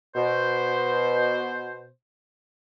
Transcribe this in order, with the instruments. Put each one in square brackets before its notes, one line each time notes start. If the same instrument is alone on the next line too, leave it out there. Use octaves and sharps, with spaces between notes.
[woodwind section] B2 C5